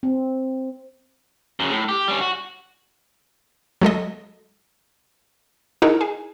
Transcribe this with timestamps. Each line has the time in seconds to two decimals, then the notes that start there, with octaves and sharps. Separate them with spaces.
0.03 C4
1.60 F#2 C#3
1.72 A2
1.89 G4
2.08 G3 C#4
2.21 F#4
3.81 F#3 G#3 A4 D#5
5.82 D#4 E4 F#4 G#4 A#4
6.01 G#4